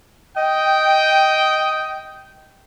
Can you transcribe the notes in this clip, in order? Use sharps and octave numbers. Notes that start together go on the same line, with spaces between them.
D#5 G5